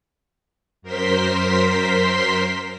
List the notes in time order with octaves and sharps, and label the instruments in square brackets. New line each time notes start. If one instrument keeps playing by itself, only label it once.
[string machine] F#2 A#4 C5 C6 B6